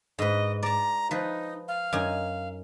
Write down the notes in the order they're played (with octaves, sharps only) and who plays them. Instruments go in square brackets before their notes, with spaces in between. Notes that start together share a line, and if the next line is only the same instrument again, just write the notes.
[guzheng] G#2 B4 [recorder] D#5
[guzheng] D5 A5 [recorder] A#5
[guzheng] F3 B4 [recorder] D#4
[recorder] F5
[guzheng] F#2 D#4 G#5